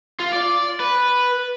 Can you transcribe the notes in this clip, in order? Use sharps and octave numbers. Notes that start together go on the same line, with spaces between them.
F4
D5
B4